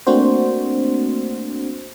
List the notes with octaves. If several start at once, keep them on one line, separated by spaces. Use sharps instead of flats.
A3 A#3 C4 D4 F#4 C5